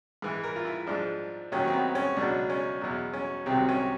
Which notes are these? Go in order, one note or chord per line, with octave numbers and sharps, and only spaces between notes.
G#2 E3
A#4
F4
E4
G#2 F3 D4
D#2 D#3 F#3 C#4
C4
B3
C#4
C#2 B2 F#3 D4
C#4
E2 B2 F#3
C#4
C2 C3 D#3 F#3 C4
C#4